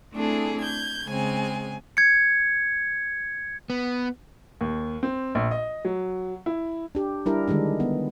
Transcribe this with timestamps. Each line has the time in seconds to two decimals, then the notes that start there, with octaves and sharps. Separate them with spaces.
0.13 A3 C4 D4 E4 G#4 A4
0.60 G6 G#6
1.06 C#3 G#3 C4 G#5
1.97 G#6 C#7
3.70 B3
4.61 D#2
5.03 C4
5.35 A#1
5.51 D#5
5.85 F#3
6.46 E4
6.95 D4 G4
7.26 G3 D4 E4 A#4
7.48 D3 D#3 G3 G#3 D4
7.80 B3